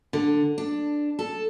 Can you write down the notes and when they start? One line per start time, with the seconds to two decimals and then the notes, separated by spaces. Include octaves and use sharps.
0.13 D3
0.58 D4
1.19 A4